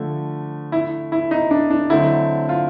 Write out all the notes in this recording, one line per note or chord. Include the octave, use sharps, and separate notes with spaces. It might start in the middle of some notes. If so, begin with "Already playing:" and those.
Already playing: D3 F3 A3
E4
E4
D#4
D4
D4
D3 F#3 A3 C4 D#4 E4
F4